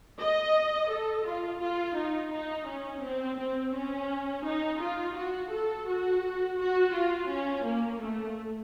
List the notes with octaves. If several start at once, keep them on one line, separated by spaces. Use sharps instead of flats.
D#5
A4
F4
F4
D#4
D#4
C#4
C4
C4
C#4
D#4
F4
F#4
A4
F#4
F#4
F4
C#4
A#3
A3